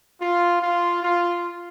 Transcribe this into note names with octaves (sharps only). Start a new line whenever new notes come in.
F4
F4
F4